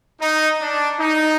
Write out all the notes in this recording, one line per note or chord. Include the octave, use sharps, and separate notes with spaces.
D#4
D4
D#4